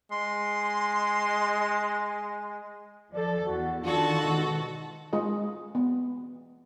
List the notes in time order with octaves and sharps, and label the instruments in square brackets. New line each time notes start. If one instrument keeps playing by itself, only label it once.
[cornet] G#3 [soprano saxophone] C6
[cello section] F3 A4 [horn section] D5
[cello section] E2 [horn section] F#4
[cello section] D#3 [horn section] D4 F4 [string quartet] F#4 A4
[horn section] G#2 B2
[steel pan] G#3 F4 G#4 D#5
B3